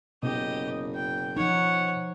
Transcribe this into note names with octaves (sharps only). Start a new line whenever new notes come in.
F#1 B2 G4 D#5
G5
F3 D#4 C#5 F#5